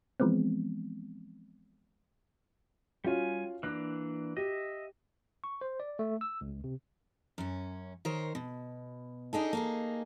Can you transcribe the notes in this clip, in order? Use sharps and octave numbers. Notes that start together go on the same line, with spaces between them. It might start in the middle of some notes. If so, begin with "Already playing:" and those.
E3 F3 G#3 B3 C4
G3 C#4 F4 F#4 G#5
E3 A#3 D4 F#6
G4 D#5 E5
C#6
C5
D5
A3
E6
C#2
C3
F#2 C#4
D#3 A#4 C5 C#5
B2
D4 D#4 G#4 A4
A#3 D#4 G#4